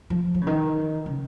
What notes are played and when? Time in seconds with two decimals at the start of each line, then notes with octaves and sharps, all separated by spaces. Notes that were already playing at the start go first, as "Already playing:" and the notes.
0.10 F3
0.35 F3
0.41 C#3
0.47 D#3
1.06 C#3